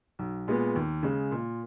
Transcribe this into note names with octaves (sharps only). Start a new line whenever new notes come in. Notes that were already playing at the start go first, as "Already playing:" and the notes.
B1
A#2 G#3 B3
D#2
C#3 G#3
A#2